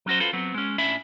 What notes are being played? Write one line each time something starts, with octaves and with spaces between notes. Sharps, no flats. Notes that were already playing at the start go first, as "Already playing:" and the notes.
F#3 C#4 F#4 C5
F4 A4 B4 C5
F#3 B3 C4
G#3 C#4
A2 C#4 D4 E4 E5 B5